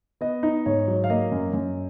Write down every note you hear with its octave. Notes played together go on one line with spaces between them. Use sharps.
B3 D#5
D#4
G#2 C#5
F#3
F5
A#3 D#5
F#2
F#2